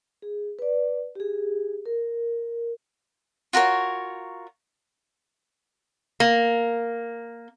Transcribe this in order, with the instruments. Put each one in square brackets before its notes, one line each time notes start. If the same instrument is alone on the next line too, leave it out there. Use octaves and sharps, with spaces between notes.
[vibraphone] G#4
B4 D5
G4 G#4
A#4
[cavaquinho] F4 F#4 A#4 C#5
[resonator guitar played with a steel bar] A#3